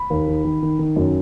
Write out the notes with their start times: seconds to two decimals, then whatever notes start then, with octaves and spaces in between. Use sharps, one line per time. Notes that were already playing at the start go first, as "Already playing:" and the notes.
Already playing: B5
0.10 D#2
0.28 D#3
0.44 D#3
0.62 D#3
0.79 D#3
0.96 F#2